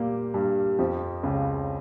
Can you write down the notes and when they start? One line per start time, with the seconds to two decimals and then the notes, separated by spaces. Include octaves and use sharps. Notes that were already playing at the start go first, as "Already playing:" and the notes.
Already playing: A#2 G3 A#3 G4
0.34 G2 G3
0.79 F2 F3
1.23 C#2 C#3